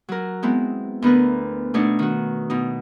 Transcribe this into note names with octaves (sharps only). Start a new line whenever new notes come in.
F#3 A#4
G#3 B3 C4 E4
D2 B3 A#4 B4
B2 A3 D4 D#4 C#5
D#3 F#4
B2 D#4